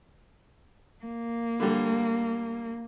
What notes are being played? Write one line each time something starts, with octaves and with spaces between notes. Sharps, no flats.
A#3
D3 G3